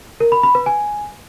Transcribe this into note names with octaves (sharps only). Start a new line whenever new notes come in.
A#4
B5
B5
B4
G#5